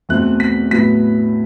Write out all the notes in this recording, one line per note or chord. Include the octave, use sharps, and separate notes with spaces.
E2 B2 A3 C4 F#6
B6
A2 F#3 B3 B6